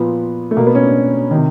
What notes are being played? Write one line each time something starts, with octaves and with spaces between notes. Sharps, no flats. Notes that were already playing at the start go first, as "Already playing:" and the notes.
Already playing: A#2 F3 B3
A3
B2 A#3
B3
C#4
D4
C3 D#3